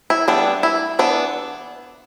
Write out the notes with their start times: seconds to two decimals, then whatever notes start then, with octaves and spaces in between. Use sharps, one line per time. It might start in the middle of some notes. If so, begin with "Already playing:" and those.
0.10 E4
0.28 G3 B3 D4
0.63 E4
0.99 E3 B3 D4